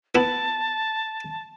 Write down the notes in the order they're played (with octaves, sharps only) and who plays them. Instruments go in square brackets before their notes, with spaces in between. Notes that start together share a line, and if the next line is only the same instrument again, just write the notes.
[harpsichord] B3 E4 B5 [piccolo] A5